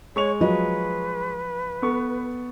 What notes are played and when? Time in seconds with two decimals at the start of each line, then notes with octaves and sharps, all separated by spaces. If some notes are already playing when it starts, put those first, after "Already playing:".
0.16 G#3 C#5 C#6 F7
0.41 F3 F#3 B4 D#5
1.82 B3 A4 C#6